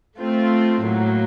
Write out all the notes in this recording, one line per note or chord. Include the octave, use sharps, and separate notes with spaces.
A3 C4 F4
A2 F#3 A#3